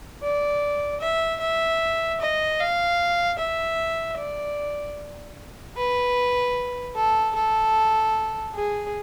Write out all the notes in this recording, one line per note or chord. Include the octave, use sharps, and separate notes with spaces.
D5
E5
E5
D#5
F5
E5
D5
B4
A4
A4
G#4